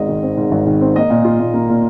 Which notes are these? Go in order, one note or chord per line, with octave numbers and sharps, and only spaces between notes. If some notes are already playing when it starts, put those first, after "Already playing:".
Already playing: G#1 G#2 D#5
D#3
C4
G#2
G#1
D#3
C4
A#3 D#5
A#2
F4
A#2
A#3
A#2